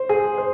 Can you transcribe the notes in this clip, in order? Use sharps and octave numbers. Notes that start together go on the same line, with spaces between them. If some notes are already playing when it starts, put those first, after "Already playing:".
Already playing: C5
G#4
C5